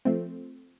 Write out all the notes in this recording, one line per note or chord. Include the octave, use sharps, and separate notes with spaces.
F3 A3 C4